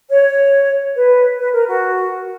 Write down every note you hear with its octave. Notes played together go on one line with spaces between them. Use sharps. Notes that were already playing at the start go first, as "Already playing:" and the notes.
C#5
B4
B4
A#4
F#4